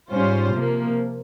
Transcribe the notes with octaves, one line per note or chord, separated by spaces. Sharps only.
G#2 G3 C#4 F4 C5
C3 F3 A#3